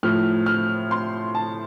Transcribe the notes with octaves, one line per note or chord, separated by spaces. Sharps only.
A2 F3 F6
F6
C6
A5